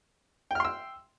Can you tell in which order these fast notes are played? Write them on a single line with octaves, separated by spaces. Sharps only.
G5 F6 C6 E6